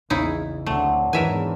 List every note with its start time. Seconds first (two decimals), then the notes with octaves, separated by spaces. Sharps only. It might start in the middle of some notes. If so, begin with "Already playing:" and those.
0.10 A#1 E2 C#3 D#4 E4
0.66 D2 F#3 A3 C4 D4
1.13 E2 G#2 D#3 E3 A#4 E5 G#5